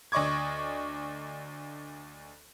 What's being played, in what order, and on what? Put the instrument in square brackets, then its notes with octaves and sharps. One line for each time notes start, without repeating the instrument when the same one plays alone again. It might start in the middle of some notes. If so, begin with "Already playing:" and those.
[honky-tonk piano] D2 D5 D#5 C#6 D6 G#6